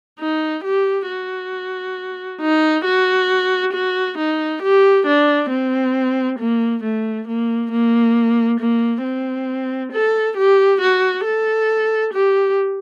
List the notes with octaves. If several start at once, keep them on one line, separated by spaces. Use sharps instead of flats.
D#4
G4
F#4
D#4
F#4
F#4
D#4
G4
D4
C4
A#3
A3
A#3
A#3
A#3
C4
A4
G4
F#4
A4
G4